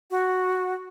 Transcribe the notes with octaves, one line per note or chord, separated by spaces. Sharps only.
F#4